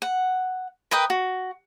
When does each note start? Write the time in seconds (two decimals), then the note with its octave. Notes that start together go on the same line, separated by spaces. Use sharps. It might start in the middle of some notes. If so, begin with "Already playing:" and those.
0.02 F#5
0.91 A#4 B4 D#5 G5
1.10 F#4